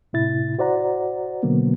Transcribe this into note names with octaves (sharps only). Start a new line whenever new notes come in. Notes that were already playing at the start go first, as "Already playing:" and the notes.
A2 C3 E4 A6
F#4 C5 D5 F#5 A#5
B2 D3 F#3 A#3 B3